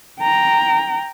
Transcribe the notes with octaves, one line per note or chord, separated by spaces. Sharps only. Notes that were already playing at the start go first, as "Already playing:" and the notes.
G5 A#5